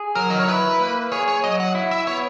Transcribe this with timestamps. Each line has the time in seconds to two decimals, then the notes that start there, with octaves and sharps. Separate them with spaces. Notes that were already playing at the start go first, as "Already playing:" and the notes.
Already playing: G#4
0.15 F#3 A#4
0.30 D#5
0.39 C#5
0.48 E4 B4
0.80 A#3
1.12 G#4 C#5
1.28 C#5
1.44 F#3 D#5
1.60 F#5
1.75 E4
1.91 E5
2.07 B3 C#5